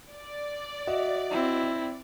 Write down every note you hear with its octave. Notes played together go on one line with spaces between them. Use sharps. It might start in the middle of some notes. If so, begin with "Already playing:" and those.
D5
F#4 D#5 E5
C4 E4